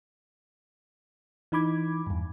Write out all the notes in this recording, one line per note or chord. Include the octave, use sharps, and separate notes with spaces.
E3 D#4 B5 D6 G#6
E2 G2